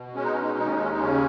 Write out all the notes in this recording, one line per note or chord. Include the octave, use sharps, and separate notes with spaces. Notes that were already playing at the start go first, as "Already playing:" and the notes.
Already playing: B2
G#3 C#4
D#4
C#4
D#4
C#4
D#2 D#4
C#4
D#4
C#4
D#4
C#3 C#4